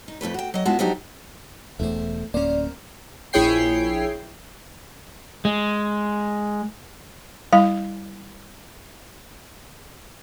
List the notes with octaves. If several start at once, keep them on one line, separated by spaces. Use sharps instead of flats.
D#4
F2 G#2 A3 B4
F#4 G5
F#3 D#5
A2 G#3 B3 F4 F#4 A5
F3 F#3 D4 D#4 F#4 G4
E1 E2 A3 C5
D1 A#3 C#4 A#4 C5 D5
A#1 E4 G#4 C#5 G5 C7
G#3
G3 E4 F5